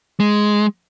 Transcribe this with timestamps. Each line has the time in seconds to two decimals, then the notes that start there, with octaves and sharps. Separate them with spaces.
0.20 G#3